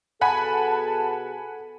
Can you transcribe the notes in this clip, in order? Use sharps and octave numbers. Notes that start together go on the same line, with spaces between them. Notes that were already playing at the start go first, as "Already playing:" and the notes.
B2 G#4 A4 F#5 G#5 A5 B5